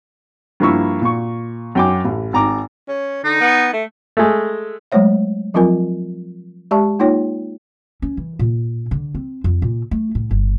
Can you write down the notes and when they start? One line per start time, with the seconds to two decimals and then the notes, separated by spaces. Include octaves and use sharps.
0.60 G2 F3 A#3 E4 C#6 E6
1.02 A#2 C#6
1.75 F#2 F#3 G5 G#5 D6
2.05 A1
2.33 G#1 A#5 D6
2.89 C#4
3.24 D3 D#4
3.41 B3
3.73 A3
4.17 G#3 A3
4.92 F#3 G#3 A3 C5 C#5 E5
5.54 F3 F#3 C4 F4 A#4 G#5
6.71 G#3 G4 D5 E5 A5 C#6
7.00 A#3 D#4 F4 C#5 G5
8.02 C#4
8.17 E3
8.39 A#2
8.91 D3
9.15 C4
9.44 F2
9.62 A#2
9.91 A3
10.15 A2
10.31 G1